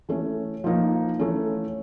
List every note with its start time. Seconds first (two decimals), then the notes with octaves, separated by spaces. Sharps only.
0.09 E3 A3 C#4
0.64 F3 A#3 D#4
1.19 E3 A3 C#4